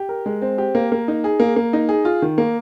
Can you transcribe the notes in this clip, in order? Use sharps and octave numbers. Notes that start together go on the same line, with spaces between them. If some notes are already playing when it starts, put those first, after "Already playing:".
Already playing: G4
A#4
G#3
C4
G4
A#3
A#3
D#4
G#4
A#3
A#3
D#4
G#4
F4
D#3
A#3